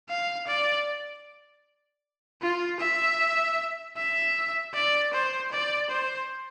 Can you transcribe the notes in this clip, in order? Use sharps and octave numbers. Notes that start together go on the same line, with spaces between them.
F5
D5
F4
E5
E5
D5
C5
D5
C5